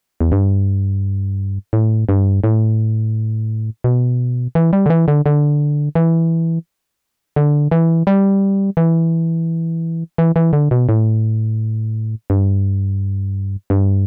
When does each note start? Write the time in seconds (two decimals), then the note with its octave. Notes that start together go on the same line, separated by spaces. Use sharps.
0.21 E2
0.32 G2
1.73 A2
2.09 G2
2.44 A2
3.84 B2
4.55 E3
4.73 G3
4.86 D3
4.90 E3
5.08 D3
5.26 D3
5.95 E3
7.36 D3
7.71 E3
8.07 G3
8.77 E3
10.18 E3
10.36 E3
10.53 D3
10.71 B2
10.89 A2
12.30 G2
13.70 G2